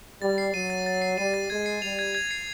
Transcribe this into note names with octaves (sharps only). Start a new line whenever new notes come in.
G3 A6
C7
F#3 D#7
A6
A6
C7
G3 D#7
A6
G#3 G#6
C7
G3 F7
G#6
G#6
C7